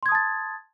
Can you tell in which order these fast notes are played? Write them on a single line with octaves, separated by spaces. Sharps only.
C6 G#6 D#6 A5 A6